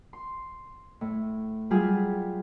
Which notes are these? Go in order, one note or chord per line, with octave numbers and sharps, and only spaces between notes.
C6
A2
F#3 G3 F4 G4 G#4 G#5